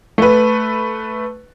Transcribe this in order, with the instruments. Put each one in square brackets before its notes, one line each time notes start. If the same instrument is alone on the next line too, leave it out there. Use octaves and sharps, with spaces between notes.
[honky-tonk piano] A3 B4